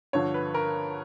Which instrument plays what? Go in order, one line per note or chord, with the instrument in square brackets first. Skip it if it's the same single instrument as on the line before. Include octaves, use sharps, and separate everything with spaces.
[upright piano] G2 D3 F3 C#5
B4
A#4